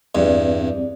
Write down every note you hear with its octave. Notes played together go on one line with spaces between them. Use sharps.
E2 G2 C4 D5